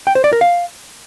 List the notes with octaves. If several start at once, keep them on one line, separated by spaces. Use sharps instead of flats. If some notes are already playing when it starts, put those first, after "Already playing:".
G5
C5
D5
A#4
F5